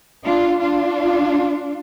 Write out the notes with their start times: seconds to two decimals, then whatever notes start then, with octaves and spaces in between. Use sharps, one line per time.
0.25 D4 F4
0.60 D4 F4